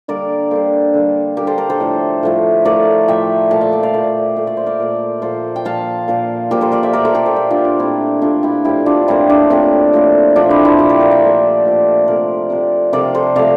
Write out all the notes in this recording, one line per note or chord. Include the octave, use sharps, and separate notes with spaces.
D3 G3 A#3 A#4 D5
D3 G3 A#3 A4 C5
D3 G3 A#3
D3 G3 A#3 G4 A#4
A4 C5
A#4 D5
A4 C5
A2 F3 A3
A2 F3 A3
A2 F3 A3 A#4 D5
A2 F3 A3 E5 G5
A#2 A3 F5 A5
E5 G5
D5 F5
D5 F5
A#2 A3 C5 E5
A#2 A3 E5
D5
C5
A#4 D5
A#2 A3
A#2 F3 A#3 A4 C5
G5
A#2 F3 A#3 F5 A5
A#2 F3 A#3
A#2 F3 A#3 G4 A#4
A4 C5
A#4 D5
C5 E5
A#2 A3 A#4 D5
A4 C5
G4 A#4
A4 C5
A#2 A3 A#4 D5
D4 F4
D4
A#2 A3 C4 E4
A#2 A3 D4 F4
E4 G4
A2 F3 A#3 E4 G4
D4 F4
A2 F3 A#3 C4 E4
D4
A2 F3 A#3 C4
A2 F3 A#3
A#2 F3 A3 D4
C4 E4
C4 E4
A#2 F3 A3 E4 G4
A#4 D5
A#4 D5
C5 E5
A#2 F3 A3
A#2 F3 A3
C3 F3 A3 A#4 D5
C3 F3 A3
C3 F3 A3 A#4 D5
A4 C5
C3 F3 A3 D5 F5